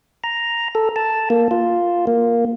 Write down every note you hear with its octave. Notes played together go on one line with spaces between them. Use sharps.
A#5
A4
A5
A#3
F4
A#3